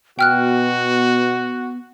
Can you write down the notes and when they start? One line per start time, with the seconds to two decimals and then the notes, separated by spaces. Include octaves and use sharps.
0.19 B2 B3 F#4 G5 F6 F#6